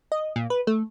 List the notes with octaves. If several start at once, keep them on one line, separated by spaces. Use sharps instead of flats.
D#5
A#2
B4
A3